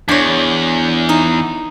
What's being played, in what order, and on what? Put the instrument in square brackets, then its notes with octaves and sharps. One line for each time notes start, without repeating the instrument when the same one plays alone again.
[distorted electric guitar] E2 [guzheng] D4 C#5
[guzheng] D#4